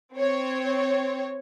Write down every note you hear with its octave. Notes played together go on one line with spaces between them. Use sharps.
C4 C#5